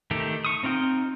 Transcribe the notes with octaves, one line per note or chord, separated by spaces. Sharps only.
D#3 A3 G4
C#6 D#6
C4 D#4 F4 G5